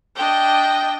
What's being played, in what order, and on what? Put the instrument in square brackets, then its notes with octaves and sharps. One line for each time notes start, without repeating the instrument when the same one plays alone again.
[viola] D4 D#5 [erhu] G5